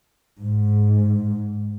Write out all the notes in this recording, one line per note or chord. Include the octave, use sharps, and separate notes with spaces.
G#2